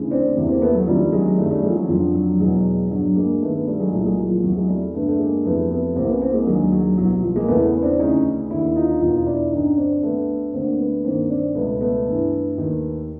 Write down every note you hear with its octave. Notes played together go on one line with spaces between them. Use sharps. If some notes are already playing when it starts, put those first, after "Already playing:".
Already playing: D2 C#3 E3
C4 D4
E2 C3 E3
A#3 C4
A3 B3
F#3
D2 C3 D#3 F3 G3
F#3 G#3
F#2 D#3 G3 A3
G3 A3
F#3 G#3
F3
F#3
F2 D3 F3
F#3
E2 B2 F#3 G#3
G2 D3 F#3
G#3 A#3
G2 D#3 A3 B3
A3 B3
G3 A3
F#3 G#3
C2 A#2 G3 A3
F#3 G#3
F#3
F3
E2 C3 E3 F#3
F#3 G#3
G3 A3
G2 D3 A3 B3
A3
G#3 A#3
F2 C3 E3 A3 B3
A3 B3
C2 C3 E3 A#3 C4
B3 C#4
A#3 C4
G#3 A#3
D#2 D3 F#3 G#3
F#3
C2 B2 F#3
F3
G#3 A#3
E2 C#3 E3 A3 B3
B3 C#4
C4 D4
D2 C#3 E3 C#4 D#4
D#2 D3 D4 E4
E4
D#4 F4
E2 B2 D#4 F4
D4 E4
G2 D3 C#4 D#4
C4 D4
D2 D3 A3 B3
D2 D3 A#3 C4
A3 B3
G2 D#3 A#3 C4
C4 D4
C#2 B2 A3 B3
A3 B3
G2 E3
D#2 D#3